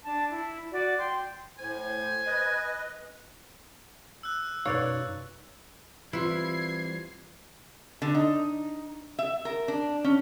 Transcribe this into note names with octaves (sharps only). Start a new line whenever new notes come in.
D4 A5
E4
F#4 D5
G5 C6
A2 C5 G#5
B4 D#5
E6 F#6
F#2 B2 D#4 B4 C#5 D5 F5
E3 G3 C4 E4 F4 B4 G#6 C7
D3
D#4
E5
A#4
D4
C#4